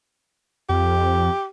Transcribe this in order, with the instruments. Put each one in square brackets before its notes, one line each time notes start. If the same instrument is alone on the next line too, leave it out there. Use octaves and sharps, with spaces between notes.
[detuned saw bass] F2 [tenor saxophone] G4